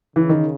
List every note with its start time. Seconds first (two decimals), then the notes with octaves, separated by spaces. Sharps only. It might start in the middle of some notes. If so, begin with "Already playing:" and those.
0.16 C#3 E3
0.29 D#3